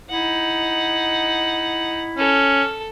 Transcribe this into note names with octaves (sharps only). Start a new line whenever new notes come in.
D#4 E4 F#5
C#4 A4